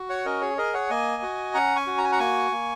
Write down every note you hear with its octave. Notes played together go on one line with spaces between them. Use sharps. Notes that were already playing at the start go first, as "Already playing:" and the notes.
Already playing: F#4
C#5 F#5
C#4 A#4 D#5
G#4 C#5
G#4 A#4 D#5
C#5 F#5
A#3 D#5 G#5
F#4
C#4 F#5 A#5
G#5 C#6
F#4
A#5
G#5
F#5 A#5
A#3 G#5 C#6
A#3